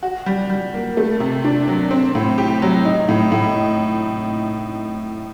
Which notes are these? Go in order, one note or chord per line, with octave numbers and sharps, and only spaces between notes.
F#4
G3
G3
A#3
A3
C3
D4
F#3
C4
A2
G4
F#3
D#4
A2
A2